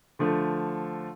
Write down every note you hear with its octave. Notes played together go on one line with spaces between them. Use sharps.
D3 F3 A3